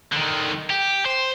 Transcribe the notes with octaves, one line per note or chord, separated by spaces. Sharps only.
D3 D#3
G4
C5